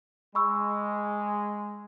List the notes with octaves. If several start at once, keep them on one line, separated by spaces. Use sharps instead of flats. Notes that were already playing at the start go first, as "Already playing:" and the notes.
G#3 B5 C#6 E6